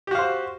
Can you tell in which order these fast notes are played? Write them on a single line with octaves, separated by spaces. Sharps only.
G4 F#4 F5 C5